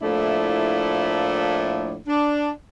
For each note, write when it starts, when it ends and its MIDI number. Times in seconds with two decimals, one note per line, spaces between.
0.01 1.96 45
0.01 1.96 53
0.01 1.96 57
0.01 1.96 58
0.01 1.96 62
0.01 1.96 64
2.07 2.51 62